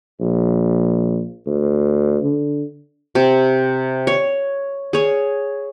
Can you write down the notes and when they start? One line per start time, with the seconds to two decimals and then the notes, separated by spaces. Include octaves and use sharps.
0.20 A#1
1.46 D2
2.22 D3
3.15 C3
4.07 C#5
4.93 G#4 C#5